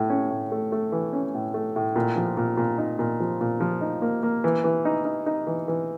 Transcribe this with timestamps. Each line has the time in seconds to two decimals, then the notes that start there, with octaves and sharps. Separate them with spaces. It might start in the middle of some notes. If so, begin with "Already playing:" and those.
Already playing: A2 A3
0.10 C#4
0.30 A2
0.52 A3
0.72 A3
0.92 E3
1.13 C#4
1.34 A2
1.54 A3
1.76 A2
1.96 A#2
2.16 F3
2.37 A#2
2.57 A#2
2.78 D#4
2.99 A#2
3.20 F3
3.41 A#2
3.60 F3
3.81 D#4
4.02 A#3
4.23 A#3
4.44 E3
4.64 E3
4.85 D#4
5.05 D#4
5.26 D#4
5.47 E3
5.68 E3